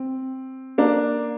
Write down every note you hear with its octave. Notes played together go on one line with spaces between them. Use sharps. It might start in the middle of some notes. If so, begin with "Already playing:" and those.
Already playing: C4
A#3 D4